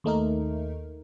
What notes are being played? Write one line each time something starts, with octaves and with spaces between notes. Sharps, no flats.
D#2 A3 D#4 A#4